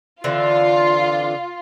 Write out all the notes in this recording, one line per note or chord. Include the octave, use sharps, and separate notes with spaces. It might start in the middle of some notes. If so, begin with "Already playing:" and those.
D3 E3 C4 F4